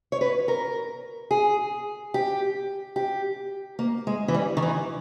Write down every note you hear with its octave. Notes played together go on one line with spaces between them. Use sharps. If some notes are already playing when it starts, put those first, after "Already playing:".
C#5
B4
A#4
G#4
G4
G4
A#3
G#3
E3
G3
D#3
E3